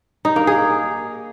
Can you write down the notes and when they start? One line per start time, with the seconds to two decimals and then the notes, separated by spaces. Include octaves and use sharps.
0.25 D#4
0.36 A#3
0.47 G#4